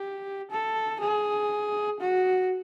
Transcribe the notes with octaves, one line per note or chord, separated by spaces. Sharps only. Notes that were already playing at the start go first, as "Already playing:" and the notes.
Already playing: G4
A4
G#4
F#4